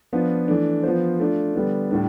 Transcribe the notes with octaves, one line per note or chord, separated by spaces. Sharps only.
F3 B3 D4 F4
E3 A3 D4
F3 B3 F4 C5
A3 D4 F4
D3 G3 B3 D4
A2 G3 D4